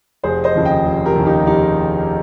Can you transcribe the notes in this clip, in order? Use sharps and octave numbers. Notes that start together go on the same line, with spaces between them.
F1 G#4 C5
C5 D#5
D#2 C#3 F3
D#5 G5
F1
G4 A#4
D#2 C#3 F3
D#4 G4
F1 D#4 G4